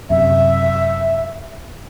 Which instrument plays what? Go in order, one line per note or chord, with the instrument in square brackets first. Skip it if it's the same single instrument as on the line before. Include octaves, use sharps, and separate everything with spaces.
[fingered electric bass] F#2 C3 [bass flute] E5